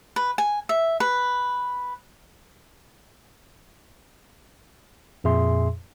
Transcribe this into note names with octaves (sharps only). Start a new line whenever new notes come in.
B4
G#5
E5
B4
F2 A#2 G#4 E5 C6